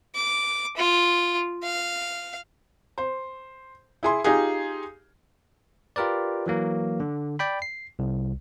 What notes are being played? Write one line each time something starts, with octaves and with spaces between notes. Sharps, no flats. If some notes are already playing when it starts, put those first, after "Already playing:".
D6
F4
F5
C5
E4 G#4 C6
D#4 F4 G4 G#4
F4 G4 A#4 B4 D5
E3 F#3 A#3
D3
D5 G5 B5
C7
C2